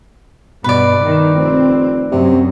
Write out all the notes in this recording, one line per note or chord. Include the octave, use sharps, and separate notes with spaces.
G2 B2 B4 D5
D#3 D#4
F1 C4
F#2 C3 F#3